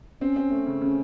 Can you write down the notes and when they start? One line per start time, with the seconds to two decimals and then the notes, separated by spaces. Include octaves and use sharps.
0.21 C4 C#4
0.36 C4
0.51 A3
0.67 C#3
0.81 C#3 C#4